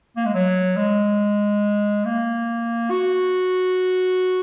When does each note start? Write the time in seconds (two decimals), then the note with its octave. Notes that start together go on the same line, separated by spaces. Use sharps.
0.16 A#3
0.25 G#3
0.34 F#3
0.76 G#3
2.05 A#3
2.90 F#4